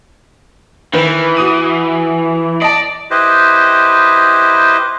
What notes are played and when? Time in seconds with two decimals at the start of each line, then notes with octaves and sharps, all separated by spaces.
0.93 D#3 E3 B4 E7
1.37 F#4 D#6 D#7
2.62 D5 D#5 A5
3.11 E4 G4 B4 C5 D#5